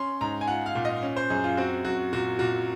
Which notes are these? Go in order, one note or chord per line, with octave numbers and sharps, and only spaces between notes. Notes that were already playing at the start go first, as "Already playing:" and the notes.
Already playing: C#4 C6
G#2 A#5
G#5
F4 F#5
F5
A#2
D#5
C#4
C5
F#2 G#4
F4
C4 F#4
F#2 F#4
A#2 F#4
A#2 F#4